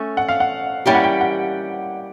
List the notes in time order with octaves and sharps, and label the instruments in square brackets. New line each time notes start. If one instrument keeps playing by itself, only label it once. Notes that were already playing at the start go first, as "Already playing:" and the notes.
Already playing: [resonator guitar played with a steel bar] A3 C#4
[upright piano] F#5
F5
F#5
[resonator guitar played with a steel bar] G3 A#3 C#4 E4 G4 [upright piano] G5
[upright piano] F#5
G5
F#5